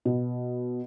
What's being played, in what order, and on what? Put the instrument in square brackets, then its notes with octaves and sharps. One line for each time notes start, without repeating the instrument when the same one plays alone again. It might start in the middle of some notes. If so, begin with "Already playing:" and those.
[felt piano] B2